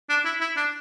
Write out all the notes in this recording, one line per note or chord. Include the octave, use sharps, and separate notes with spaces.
D4
E4
E4
D4